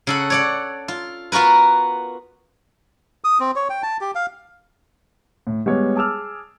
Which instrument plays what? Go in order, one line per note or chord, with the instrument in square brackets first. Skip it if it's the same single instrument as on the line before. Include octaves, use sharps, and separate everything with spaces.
[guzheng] C#3 A4 F#5
C#5 D5 F#5
F4
B3 F4 F#4 A#4 B4
[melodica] D#6
C4
C#5
G5
A5
G4
F5
[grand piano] A2
G3 G#3 B3 C#5
G#4 A5 D6 E6 F6